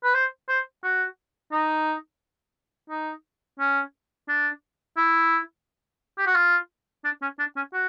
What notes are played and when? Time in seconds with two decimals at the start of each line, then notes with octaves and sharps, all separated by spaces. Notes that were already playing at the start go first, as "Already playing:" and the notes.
0.04 B4
0.14 C5
0.49 C5
0.84 F#4
1.52 D#4
2.90 D#4
3.59 C#4
4.29 D4
4.97 E4
6.18 G4
6.27 F#4
6.35 F4
7.04 D4
7.22 C#4
7.39 D4
7.56 C#4
7.73 F#4